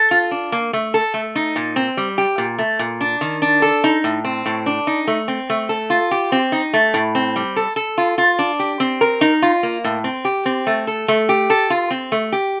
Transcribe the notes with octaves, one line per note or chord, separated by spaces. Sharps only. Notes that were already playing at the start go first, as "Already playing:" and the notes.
Already playing: A4
F4
D4
A#3
A3
A4
A3
D#4
A#2
C4
G3
G4
A#2
A3
A#2
D4
D#3
D4
A4
D#4
A2
C4
A2
D4
D#4
A3
C4
A3
A4
F4
G4
C4
D#4
A3
A2
C4
G3
A4
A4
F4
F4
D4
G4
C4
A#4
D#4
F4
A#3
A2
C4
G4
C4
A3
A4
A3
G4
A4
F4
C4
A3
G4